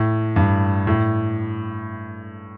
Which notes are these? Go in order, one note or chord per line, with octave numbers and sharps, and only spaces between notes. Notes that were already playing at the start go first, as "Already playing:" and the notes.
Already playing: A2
G2
A2